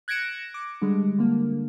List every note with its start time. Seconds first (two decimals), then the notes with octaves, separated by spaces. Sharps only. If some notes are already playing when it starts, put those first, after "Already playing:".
0.08 F#6 G#6 A#6 C#7 D7 E7
0.54 D6
0.81 D3 G3 G#3
1.18 D3 A#3